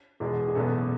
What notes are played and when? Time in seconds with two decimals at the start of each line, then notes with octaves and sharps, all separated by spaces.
0.20 E2 B2 G#3
0.48 G#4
0.55 F#1 E2 B2 G#3 B3 A4